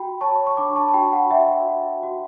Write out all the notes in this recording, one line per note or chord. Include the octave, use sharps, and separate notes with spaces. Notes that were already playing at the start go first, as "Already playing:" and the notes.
Already playing: F#4 G5 B5
C#5 A5 C#6
C#6
D4 B5 D6
A5 C#6
A5
F#4 G5 B5
F#5
F#4 E5 G5
F#4
F#4